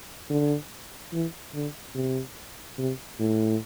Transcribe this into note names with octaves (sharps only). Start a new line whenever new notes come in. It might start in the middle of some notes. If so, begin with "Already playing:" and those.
D3
E3
D3
C3
C3
A2